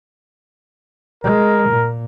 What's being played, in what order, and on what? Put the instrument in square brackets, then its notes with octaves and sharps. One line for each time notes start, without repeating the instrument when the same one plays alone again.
[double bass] G#3 [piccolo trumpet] A#4
[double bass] A#2